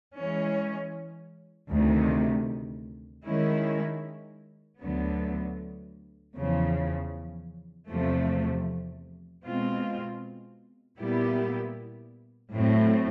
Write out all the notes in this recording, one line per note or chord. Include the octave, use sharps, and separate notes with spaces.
E3 G#3 C#4
D2 C3 D#3
D#3 G#3 C#4 E4
D2 D3 F#3 B3
E2 C#3 F3
E2 C3 F3 A3
B2 G#3 C4 F4
A#2 G3 B3 E4 G4
A2 F#3 A3 C4